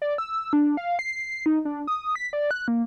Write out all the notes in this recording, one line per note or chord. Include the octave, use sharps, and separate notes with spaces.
D5
E6
D4
F5
C7
D#4
D4
D#6
B6
D5
F#6
A#3